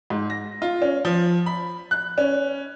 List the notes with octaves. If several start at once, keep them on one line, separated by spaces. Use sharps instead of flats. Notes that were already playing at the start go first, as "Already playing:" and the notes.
G#2
A#6
F4
C#4
F3
B5
F#6
C#4